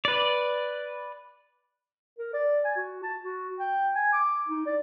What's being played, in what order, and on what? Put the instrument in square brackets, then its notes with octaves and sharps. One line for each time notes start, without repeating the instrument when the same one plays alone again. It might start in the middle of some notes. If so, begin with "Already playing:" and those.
[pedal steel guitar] B4 D5
[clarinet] A#4
D5
G#5
F#4
A5
F#4
G5
G#5
D6
D#4
D5